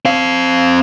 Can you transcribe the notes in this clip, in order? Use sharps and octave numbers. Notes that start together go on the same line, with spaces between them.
C4 F5